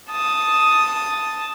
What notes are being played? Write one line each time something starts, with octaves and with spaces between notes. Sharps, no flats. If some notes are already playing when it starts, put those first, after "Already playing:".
A5 D#6